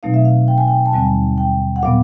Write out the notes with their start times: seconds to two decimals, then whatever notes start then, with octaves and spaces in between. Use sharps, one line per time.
0.03 B2 F#3 A3 C4 D#4 F5
0.14 E5
0.25 F5
0.48 G5
0.58 G#5
0.68 G5
0.86 A5
0.93 D#2 D3 G3 C4 G#5
1.38 G5
1.76 F#5
1.83 A#2 F#3 B3 F5